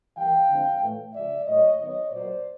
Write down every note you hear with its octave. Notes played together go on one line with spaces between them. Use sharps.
E3 G3 A#3 F5 G5
D3 F3 G#3 C4
A2 E3 A3
C#3 F3 G#3 D5 E5
A2 F#3 A#3 C#5 D#5
D#3 F#3 B3 C#5 D#5
A#2 F#3 A#3 C5 D5